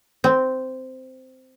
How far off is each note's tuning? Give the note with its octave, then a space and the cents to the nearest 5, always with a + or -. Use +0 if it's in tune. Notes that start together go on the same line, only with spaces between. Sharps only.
C4 -10